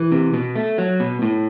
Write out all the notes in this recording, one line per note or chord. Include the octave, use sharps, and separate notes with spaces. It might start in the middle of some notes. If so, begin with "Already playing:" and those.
Already playing: E3
C3
B2
A3
F#3
B2
A2